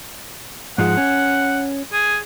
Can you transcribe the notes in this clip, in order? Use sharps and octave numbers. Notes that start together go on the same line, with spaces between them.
G#2 F3 G#3 F#5
C#4
G#4